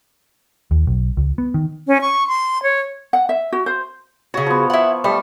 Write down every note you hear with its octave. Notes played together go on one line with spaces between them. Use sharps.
D#2
B1
C#2
B3
D#3
C#4
C#6
C6
C#5
F#5
E5
F#4
C5
C#3 F#4 C#5
F3 B3
E4 F#5
G3 A3